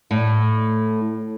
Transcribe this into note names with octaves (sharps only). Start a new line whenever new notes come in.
A2